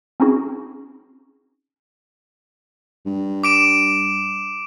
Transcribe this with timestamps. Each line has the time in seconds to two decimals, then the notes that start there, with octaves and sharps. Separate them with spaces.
0.20 C4 C#4 D#4 E4 F#4 G#4
3.06 G2
3.44 D6 D7 E7